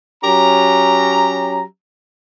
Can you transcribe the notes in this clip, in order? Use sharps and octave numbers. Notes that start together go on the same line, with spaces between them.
F#3 C#4 G4 A#5